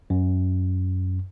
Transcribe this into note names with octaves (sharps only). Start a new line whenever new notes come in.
F#2